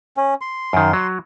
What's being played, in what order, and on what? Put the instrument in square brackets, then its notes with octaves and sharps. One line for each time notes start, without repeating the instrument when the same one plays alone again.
[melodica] C#4
C6
[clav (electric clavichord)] F#2 D#3
F#3